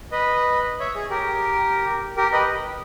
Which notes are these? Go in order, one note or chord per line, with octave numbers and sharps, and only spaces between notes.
B4 D#5
C#5 E5
G#4
G4 A#4
G4 A#4
B4 D#5